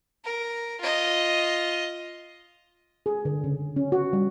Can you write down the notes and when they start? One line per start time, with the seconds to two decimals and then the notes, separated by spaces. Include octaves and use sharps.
0.25 A#4
0.81 F4 D#5
3.06 G#4
3.25 D3
3.44 C#3
3.76 C#4
3.92 F#4
4.13 G3